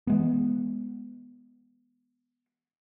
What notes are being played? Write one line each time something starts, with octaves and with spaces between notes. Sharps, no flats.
E3 G#3 B3